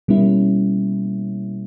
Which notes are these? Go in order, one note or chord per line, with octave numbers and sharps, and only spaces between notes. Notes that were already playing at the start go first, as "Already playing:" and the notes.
B2 G3 A#3 C#4 E4